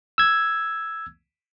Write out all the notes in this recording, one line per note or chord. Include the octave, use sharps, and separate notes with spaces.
E6 G#6